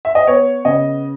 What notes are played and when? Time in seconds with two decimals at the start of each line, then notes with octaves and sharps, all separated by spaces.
0.05 E5
0.15 D#5
0.27 B3 C#5
0.65 C#3 D#5